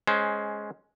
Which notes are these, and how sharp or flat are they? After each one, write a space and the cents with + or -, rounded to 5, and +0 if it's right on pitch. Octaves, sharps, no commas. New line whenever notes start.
G#3 +10 C#4 +0 C5 +0